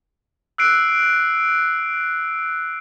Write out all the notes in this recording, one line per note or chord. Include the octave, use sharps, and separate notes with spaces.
E6 F#6 C7 D7